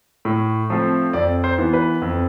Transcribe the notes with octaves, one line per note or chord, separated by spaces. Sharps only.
A2
F3 A3 C4
F2 D5
C5
E3 B3
B4
F2